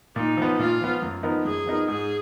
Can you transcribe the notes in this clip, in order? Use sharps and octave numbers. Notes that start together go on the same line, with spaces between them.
A#2 D#4
F3 B3
A#2 F4
F3 B3
F#2
F3 B3 D#4 A#4
F#2 G#4
F3 B3 D#4 A#4
G#2 G#4